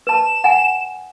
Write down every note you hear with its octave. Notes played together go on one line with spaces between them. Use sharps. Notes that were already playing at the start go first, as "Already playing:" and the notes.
B4 A5 E7
F#5 G#5